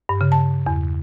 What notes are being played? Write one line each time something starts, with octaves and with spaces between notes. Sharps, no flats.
G2
C#3
A5
E2